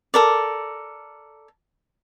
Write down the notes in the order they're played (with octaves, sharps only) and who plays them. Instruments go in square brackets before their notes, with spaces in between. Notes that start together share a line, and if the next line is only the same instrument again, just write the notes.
[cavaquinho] A4 A#4 D5